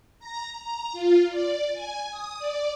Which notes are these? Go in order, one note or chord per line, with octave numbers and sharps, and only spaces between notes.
A#5
A#5
F4
D5
G#5
D#6
D5